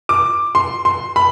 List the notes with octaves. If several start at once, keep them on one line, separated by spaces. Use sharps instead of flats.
D6
C6
C6
B5